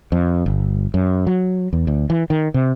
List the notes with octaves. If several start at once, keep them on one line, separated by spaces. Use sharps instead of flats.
F2
G1
F#2
F#3
E2
D2
E3
D#3
C3